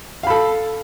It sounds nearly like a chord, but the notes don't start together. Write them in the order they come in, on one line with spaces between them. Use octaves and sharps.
F5 B5 A4